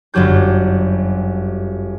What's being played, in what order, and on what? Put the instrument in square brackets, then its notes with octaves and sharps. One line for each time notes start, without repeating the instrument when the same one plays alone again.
[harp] G1 F#2 F#3 G4 G6